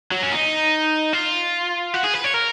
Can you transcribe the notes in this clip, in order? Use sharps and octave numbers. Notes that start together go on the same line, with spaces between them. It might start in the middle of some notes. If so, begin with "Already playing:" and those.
F#3
C#4
D#4
F4
F#4
G#4
B4
C#5
A#4